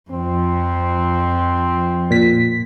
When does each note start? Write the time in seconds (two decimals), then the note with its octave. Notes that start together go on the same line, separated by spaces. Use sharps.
0.10 F2 F3 C4
2.11 A#2 B6